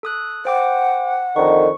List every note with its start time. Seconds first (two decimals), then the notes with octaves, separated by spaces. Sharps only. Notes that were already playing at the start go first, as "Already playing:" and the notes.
0.03 A4 D#6 F#6
0.45 C5 F#5 G5 D6
1.36 F2 D3 D#3 C#6